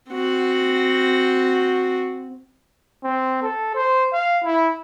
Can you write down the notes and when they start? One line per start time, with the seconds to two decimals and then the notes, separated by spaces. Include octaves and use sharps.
0.11 C4 F#4
3.04 C4
3.42 A4
3.75 C5
4.12 F5
4.43 E4